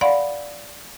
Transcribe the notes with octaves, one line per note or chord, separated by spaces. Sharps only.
D5 F5 F#5 B5 C6